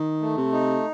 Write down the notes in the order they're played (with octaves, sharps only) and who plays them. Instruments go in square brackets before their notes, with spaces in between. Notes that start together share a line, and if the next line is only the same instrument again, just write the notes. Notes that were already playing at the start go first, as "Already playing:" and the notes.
Already playing: [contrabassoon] D#3
[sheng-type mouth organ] A3
[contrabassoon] C3
[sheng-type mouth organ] D#4